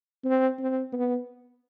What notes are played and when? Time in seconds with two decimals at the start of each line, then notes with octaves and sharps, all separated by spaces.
0.25 C4
0.59 C4
0.93 B3